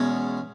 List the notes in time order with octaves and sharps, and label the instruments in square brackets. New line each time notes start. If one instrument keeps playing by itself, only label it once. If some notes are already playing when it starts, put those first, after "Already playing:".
Already playing: [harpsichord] E2 B2 G#3 C#4